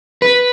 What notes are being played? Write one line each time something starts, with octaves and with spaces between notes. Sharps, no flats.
B4